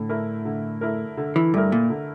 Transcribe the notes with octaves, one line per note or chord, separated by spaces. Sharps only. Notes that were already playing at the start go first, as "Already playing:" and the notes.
Already playing: A2 D3
A3 E4 A#4
D3
A3 E4 A#4
D3
E3
G2 A3 E4 A#4
A#2
D3